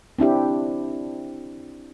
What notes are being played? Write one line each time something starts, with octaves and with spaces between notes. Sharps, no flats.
C4 D4 E4 G4